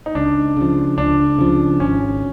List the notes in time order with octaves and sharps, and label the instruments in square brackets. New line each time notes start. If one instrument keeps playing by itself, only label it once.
[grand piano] D#4
[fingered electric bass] C#2 [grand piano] D4
[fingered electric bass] C#3 F3
[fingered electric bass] C#2 [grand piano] D4
[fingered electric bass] C#3 F3
[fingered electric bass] G#1 [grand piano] C#4